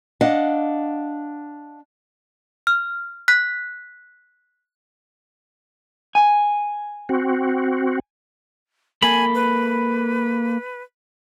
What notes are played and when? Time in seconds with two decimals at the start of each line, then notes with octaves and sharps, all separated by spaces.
0.21 D4 D#5 F5 F#5
2.67 F6
3.28 F#6 B6
6.15 G#5
7.09 C4 F#4
9.02 A#3 A4 G#5 B5
9.35 B4